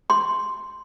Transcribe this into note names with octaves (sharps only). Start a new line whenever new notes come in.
C6